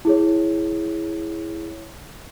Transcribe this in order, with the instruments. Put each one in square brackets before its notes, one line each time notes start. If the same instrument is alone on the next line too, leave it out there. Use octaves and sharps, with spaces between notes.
[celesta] E4 G#4 C#5